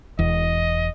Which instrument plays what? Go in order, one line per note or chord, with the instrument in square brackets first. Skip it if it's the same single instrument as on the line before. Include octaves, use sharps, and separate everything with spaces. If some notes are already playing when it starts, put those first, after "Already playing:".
[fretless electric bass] E1 E2 [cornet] D#5